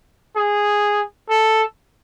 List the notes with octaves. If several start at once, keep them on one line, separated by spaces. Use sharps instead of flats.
G#4
A4